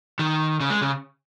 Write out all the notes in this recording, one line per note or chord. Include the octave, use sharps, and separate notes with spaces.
D#3
C#3
G#3
C#3